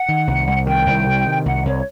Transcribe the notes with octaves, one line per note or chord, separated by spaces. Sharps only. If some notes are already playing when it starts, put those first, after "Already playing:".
Already playing: F#5
D#3
C2
C2
D#3 G5
C2
C3
D#3
C2 F#5
C2 C#5